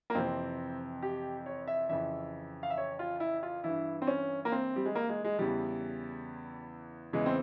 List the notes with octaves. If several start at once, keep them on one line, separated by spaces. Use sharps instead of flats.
A#3
F2 C3 E3 C4
G4
C#5
E5
F2 C#3 E3 E5
F5
E5
C#5
F4
E4
F4
G2 E3 E4
C4
C#4
A#3
C4
G3
G#3
A#3
G#3
G#3
E2 C#3 E3 G3
E2 C#3 E3 G#3
C4